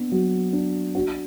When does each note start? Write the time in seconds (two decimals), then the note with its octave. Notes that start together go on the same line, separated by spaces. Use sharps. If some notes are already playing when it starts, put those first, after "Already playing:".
Already playing: B3 D4
0.12 F#3
0.53 D4
0.95 D4 F#4